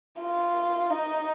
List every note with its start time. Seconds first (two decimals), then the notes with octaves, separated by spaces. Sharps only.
0.20 F4
0.90 D#4